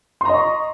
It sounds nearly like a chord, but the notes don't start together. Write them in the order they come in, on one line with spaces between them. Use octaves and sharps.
C6 A#5 D#5 C#6